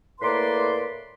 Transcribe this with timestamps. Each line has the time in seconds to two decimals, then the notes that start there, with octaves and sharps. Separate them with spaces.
0.22 A2 A#3 B4 D5 C6